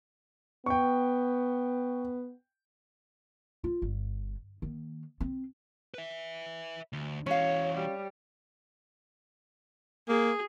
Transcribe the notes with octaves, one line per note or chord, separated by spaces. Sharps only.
B3 G5 C#6
F4
G1
D#3 A#3
C4
B4 E5
D2
E3 C#4 F#4 C#5 F5
G3
A#3 G#4